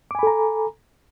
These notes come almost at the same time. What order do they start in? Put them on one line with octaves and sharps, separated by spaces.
D6 G#5 B5 A4 A#5